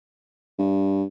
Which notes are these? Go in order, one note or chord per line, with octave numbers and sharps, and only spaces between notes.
G2